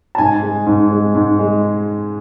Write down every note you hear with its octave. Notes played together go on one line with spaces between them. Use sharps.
A5
G#2 G#5
G#3
G#2
G#3
G#2
G#3